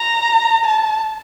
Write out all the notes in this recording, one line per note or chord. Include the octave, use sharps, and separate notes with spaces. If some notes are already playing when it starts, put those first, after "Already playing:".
Already playing: A#5
A5